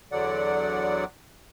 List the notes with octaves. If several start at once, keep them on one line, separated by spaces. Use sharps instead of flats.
E2 D3 F#3 D5 F#5